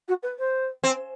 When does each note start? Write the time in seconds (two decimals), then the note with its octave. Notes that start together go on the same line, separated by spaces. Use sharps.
0.08 F#4
0.23 B4
0.39 C5
0.84 C4